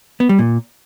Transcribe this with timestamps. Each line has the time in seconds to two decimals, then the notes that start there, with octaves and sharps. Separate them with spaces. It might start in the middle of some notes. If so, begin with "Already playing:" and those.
0.20 B3
0.29 G3
0.39 A#2